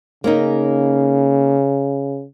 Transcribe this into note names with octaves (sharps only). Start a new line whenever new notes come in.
C#3 A#3 C#4 D#4